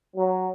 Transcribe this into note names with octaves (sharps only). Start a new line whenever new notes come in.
F#3